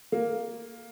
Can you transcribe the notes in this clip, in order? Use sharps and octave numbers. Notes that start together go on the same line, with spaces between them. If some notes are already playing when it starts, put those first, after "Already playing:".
A#3